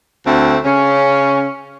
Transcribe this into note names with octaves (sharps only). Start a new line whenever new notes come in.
D2 A3 C4
C#3 C#4